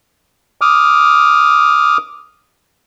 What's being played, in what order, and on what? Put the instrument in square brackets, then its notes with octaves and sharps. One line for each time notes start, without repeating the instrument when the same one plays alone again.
[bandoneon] D6 D#6 F6